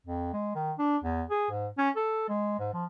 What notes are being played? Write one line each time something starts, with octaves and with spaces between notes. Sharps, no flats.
F2
G#3
D#3
D4
E2
G#4
G#2
C#4
A4
G#3
G#2
F3